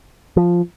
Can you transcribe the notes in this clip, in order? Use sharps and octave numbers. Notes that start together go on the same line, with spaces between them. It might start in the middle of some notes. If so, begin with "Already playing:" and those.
F3